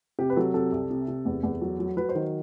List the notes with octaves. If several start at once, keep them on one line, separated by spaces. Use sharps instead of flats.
C3 G4
B4
F#3 A4
C3 A4
C2
C3
C3
E2
E2
F#3
F#3
F#3 B4
C5
D#3